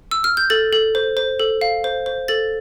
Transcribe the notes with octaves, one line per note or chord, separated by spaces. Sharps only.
E6
F6
G6
A4 A6
A4
C5
C5
A4
F5
C5
C5
A4 A6